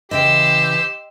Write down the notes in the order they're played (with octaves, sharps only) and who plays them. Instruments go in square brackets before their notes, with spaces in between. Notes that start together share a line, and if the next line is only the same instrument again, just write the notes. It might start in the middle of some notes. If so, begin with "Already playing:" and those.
[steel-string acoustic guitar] C#3 E3 [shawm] G4 [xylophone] D#5 G5 [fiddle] C6 E6